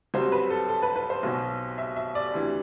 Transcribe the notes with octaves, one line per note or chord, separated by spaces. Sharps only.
C2 C3 F#3 C5
B4
A4
A4
B4
B4
C5
B1 B2 F#3
E5
E5
D5
D2 C3 E3